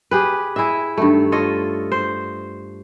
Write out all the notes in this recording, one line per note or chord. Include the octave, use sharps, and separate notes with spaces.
G4 G#4 B4
E4 G#4 D#5 E5
G2 D#3 A3
F4 A4 C#5 D#5
C5